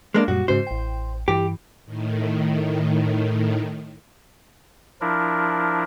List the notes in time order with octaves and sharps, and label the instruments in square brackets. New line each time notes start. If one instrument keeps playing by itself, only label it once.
[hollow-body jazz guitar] G#3 A#3 D4
[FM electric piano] F#2 A#2 G3 [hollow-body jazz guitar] F#4
[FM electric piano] G#2 C#3 F#4 [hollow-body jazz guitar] C5
[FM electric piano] A1 G5
[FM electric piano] G2 E3 [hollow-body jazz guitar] G4
[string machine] A2 D#3
[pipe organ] F3 D4 E4 A#4